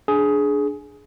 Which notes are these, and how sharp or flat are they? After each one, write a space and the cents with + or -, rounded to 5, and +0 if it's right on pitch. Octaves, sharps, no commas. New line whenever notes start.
D4 +0 G#4 +15